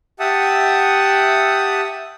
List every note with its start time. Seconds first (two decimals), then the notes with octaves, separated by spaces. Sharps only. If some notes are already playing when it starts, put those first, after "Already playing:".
0.20 G4 E5 F#5 A5 D#6